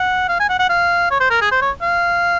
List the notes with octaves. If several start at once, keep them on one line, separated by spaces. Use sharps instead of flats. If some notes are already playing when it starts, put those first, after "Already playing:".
Already playing: F#5
F5
G#5
F#5
F#5
F5
C#5
C5
A#4
G#4
C5
C#5
F5